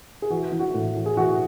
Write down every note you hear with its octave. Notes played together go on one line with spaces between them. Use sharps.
G#4
E3 F#4
E3
F#4
A2
E3
G#4
E3 F#4